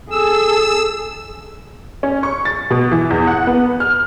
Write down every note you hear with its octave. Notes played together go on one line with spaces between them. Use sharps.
G#4 A4 E6
C#4
C#6
A6
B2
E3
E2
F#5
B3
F6